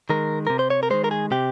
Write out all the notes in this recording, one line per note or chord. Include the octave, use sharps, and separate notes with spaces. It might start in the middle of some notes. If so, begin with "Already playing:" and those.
D#3 G#3 A#4
C3 A#4
C5
C#5
A#4
D#3 G#3 C5
A#4
G#4
C3 G4